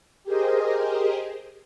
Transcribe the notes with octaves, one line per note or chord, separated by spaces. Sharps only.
G4 G#4 A#4 C5 D#5